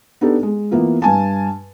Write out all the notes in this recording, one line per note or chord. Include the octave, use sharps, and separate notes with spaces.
B3 D4 D#4 G4 A4
G#3
E3 A#3 B3 F4
G2 G#5 A5